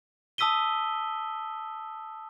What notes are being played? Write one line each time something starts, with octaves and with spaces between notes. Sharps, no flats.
A5 D#6 E6 B6 D#7 G7